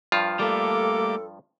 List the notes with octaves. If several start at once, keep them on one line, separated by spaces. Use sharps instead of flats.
G2 F3 F4
G3 A3 A#3 A4 D6